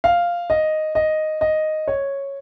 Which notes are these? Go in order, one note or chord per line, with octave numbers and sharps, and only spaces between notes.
F5
D#5
D#5
D#5
C#5